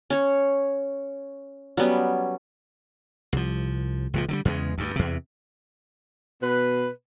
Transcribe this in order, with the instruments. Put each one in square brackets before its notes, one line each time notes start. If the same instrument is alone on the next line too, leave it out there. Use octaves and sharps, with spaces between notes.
[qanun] C#4 C#5
F#3 G3 B3 C#4
[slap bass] C2 F3
C#2 A#2 F3
D3 E3 G3
E2 C#3 F#3 G#3
D2 G2
E2 C3
[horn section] B2 B3 B4